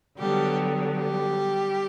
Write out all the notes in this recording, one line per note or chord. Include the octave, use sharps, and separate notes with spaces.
D3 F#3 G3 B3 G4
G3 G4